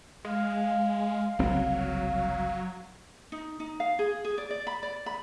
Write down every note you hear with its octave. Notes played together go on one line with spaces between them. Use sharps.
G#3 F5
F#1 C2 F#3 C4
D#4
D#4
F5
G#4
G#4
D5
D5
B5
D5
B5